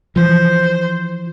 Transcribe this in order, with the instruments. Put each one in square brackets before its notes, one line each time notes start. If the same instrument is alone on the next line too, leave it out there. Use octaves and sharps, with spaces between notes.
[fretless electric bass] E3 F3 [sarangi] C5